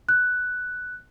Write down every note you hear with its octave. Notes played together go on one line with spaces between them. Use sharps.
F#6